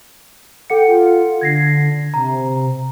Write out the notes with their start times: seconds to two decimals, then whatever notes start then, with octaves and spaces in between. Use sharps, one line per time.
0.70 A4 F#5 G5 C#7
0.88 F4
1.41 D3 G#6 A#6 C7
2.14 C3 A#5